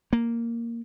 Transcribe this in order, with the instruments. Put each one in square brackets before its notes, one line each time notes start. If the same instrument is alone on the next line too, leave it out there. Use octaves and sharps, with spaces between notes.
[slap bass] A#3